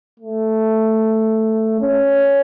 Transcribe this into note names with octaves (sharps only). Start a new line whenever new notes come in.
A3
C#4